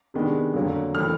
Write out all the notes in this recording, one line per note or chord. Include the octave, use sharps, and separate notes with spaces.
C3 D#3 G#3 B3 D4
F2 D3 F#3 A#3
E3 A3 C4 F6